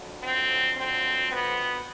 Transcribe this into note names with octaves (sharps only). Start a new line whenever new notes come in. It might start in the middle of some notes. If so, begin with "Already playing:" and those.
Already playing: F2 D3 F#3
C4
C4
B3